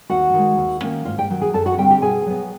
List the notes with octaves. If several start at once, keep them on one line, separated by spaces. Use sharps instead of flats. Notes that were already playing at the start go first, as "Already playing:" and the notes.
D#2 F#4 F#5
D#3 G#3
D#2
D#3 F#3 A#3 C#4
G#2 F4 F5
G4 G5
D#3 F#3
G#4 G#5
F#2 A4 A5
F#4 F#5
D3 G3 C4 G4 G5
G4 G5
B2 G#4 G#5
F#3 B3